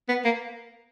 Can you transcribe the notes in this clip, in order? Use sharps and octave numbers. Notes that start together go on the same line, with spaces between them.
B3
A#3